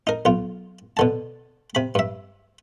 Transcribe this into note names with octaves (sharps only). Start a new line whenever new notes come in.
D#4 A#4
B1 F4
B2 D3 A5
C3 B5
G2 E5